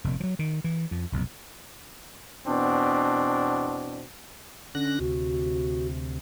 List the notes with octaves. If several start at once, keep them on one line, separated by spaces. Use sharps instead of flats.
F1 A#2
F3 F#3
D#3
E3
F2
F1 B1
E2 B2 C4 D4
D3 C#4 F#6 A#6
D2 C3 F#4